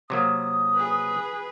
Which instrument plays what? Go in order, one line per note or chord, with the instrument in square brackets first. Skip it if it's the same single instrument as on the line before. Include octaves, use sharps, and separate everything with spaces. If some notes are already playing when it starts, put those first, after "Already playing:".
[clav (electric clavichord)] C3 F#3 A#3 [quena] D#6
[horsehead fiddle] G#4 B4